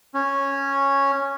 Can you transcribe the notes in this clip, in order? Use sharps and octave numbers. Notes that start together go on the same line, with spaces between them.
C#4